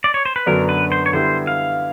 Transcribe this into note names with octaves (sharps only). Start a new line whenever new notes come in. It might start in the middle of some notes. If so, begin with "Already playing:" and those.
D5
C#5
C5
B4
F#2 D3 F#3 B3 D4 A#4
B4
C5
C#5
D3 G3 B3 E4 C5
F5